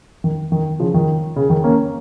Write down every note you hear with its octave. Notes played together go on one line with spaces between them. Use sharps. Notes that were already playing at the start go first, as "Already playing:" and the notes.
D#3
D#3
C#3 F3
D#3
C#3
D#3
A#3 C#4